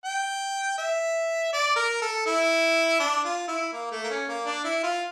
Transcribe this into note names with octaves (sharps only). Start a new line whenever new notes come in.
G5
E5
D5
A#4
A4
E4
D4
F4
E4
A#3
A3
A#3
C#4
A#3
D4
E4
F4